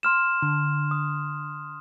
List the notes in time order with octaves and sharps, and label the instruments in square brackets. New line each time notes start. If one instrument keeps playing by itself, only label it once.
[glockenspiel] C6 F6 E7
[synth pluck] D3
[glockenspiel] D#6